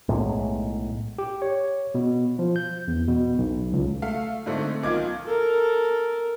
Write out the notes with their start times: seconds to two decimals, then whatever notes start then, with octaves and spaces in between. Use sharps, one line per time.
0.09 B1 A2 G#3
1.19 G4
1.42 C#5
1.95 B2
2.39 F3
2.56 G6
2.88 E2
3.08 B2
3.38 B1
3.73 C#2
4.02 A3 F5
4.46 G#2 D3 A3 C4 D4
4.83 B1 D#3 F4 D6 G#6
5.26 A4 A#4